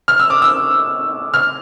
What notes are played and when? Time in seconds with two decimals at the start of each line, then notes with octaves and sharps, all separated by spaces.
0.08 F6
0.20 E6
0.30 D6
0.42 E6
1.34 F6